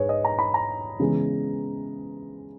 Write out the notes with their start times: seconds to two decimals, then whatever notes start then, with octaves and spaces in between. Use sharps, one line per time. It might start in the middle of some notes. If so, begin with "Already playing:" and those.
Already playing: G#2 G#4 B4 C#5
0.09 D#5
0.25 A#5
0.39 B5
0.54 A#5
1.00 C#3 E3 G#3 B3